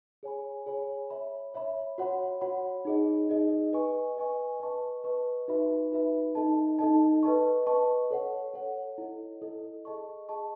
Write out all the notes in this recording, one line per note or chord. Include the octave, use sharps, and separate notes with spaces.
G#4 C#5 G#5 B5
G#4 C#5 G#5 B5
C#5 E5 B5
C#5 E5 B5
F#4 C#5 F#5 B5
F#4 C#5 F#5 B5
D#4 G#4 D#5
D#4 G#4 D#5
B4 D#5 G#5 C#6
B4 D#5 G#5 C#6
B4 D#5 A5 C#6
B4 D#5 A5 C#6
D#4 F#4 B4 E5 B5
D#4 F#4 B4 E5 B5
D#4 A4 D#5 A5
D#4 A4 D#5 A5
B4 D#5 A5 C#6
B4 D#5 A5 C#6
A4 C#5 F#5
A4 C#5 F#5
E4 A4 D#5
E4 A4 D#5
G#4 D#5 A5 C#6
G#4 D#5 A5 C#6